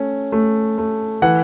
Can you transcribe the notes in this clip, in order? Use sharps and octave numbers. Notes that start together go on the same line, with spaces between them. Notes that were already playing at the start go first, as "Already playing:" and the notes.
Already playing: A3 C#4
A3
A3
E3 F#5